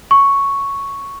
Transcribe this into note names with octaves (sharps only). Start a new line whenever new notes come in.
C#6